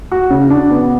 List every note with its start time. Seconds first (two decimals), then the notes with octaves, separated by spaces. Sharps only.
0.12 F#4
0.30 C#3
0.50 D4
0.71 B3